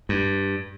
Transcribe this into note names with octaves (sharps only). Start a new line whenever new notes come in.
G2